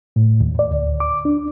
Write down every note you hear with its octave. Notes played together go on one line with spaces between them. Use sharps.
A2
D#2
D5
D2
D6
D4